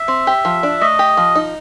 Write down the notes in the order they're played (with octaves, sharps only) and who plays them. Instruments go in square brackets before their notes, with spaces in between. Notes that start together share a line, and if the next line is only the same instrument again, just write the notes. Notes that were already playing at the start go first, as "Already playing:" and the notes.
Already playing: [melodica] E5
[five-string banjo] C4
G4
F3
D4
[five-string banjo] A3 [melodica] D#5
[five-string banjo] G4
F3
D#4